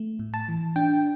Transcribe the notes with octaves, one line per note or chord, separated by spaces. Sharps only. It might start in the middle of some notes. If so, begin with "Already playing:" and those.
Already playing: A3
A2
A5
E3
D4 G5